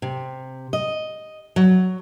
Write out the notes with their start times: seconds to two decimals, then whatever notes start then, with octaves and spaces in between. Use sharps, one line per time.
0.02 C3
0.73 D#5
1.56 F#3